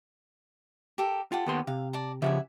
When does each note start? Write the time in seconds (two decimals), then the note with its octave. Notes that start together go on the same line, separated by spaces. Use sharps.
0.98 G4 A4 A#4
1.32 F4 G4 A4 F#5
1.46 D#2 B3 C6
1.67 C3 F5
1.93 D5 A5 A#5
2.22 C#3 F3 G4 E5 F#5 G#5